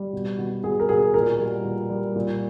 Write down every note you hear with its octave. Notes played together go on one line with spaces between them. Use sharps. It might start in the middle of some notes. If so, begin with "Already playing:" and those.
Already playing: G3
B2
B2
B2 G#4
A#4
B2 G#4
A#2 A#4
G3
A#2
G3
A#2